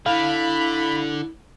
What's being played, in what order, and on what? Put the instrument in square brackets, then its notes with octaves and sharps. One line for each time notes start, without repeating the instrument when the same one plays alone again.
[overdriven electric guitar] D3 [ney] E4 [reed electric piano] F5 [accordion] B5